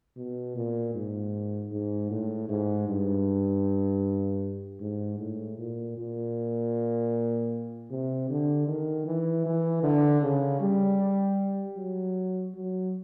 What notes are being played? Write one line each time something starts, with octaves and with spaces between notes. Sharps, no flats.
B2
A#2
G#2
G#2
A2
G#2
G2
G#2
A2
A#2
A#2
C3
D3
D#3
E3
E3
D3
C#3
G3
F#3
F#3